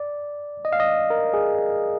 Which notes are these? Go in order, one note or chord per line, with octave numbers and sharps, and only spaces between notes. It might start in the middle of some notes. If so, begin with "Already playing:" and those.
Already playing: D5
D#5
F5
D#5
A#4
G#4